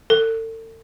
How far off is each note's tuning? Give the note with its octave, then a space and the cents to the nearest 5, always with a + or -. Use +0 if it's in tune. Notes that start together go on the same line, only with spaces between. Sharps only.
A4 +40